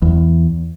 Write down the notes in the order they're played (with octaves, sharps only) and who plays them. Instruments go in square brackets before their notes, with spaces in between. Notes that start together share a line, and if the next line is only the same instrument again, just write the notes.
[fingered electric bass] E2